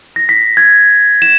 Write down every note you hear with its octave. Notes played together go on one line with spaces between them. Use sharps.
A#6
B6
G#6
E7